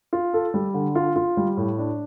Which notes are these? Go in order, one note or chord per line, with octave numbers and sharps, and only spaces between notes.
F4
A4
G3
D3
F4
F4
G3
A2
D4